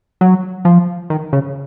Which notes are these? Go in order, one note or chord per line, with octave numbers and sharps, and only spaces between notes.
F#3
F3
D#3
C#3